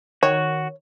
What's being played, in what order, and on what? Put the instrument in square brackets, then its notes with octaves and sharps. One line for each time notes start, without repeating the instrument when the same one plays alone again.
[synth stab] D#3 [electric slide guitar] F#4 [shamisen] C#5